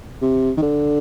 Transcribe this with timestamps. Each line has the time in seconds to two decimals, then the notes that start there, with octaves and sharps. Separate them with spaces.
0.22 C3
0.57 D#3
0.62 D3